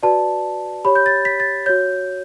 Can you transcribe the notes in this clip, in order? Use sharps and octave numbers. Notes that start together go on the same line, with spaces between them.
F#4 B4 D5 A5
G4 C#5 B5
G6
A6
B6
A6
F#4 C#5 G6